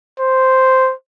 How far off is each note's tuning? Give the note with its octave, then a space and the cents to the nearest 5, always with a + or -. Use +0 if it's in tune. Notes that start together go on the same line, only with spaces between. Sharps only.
C5 -5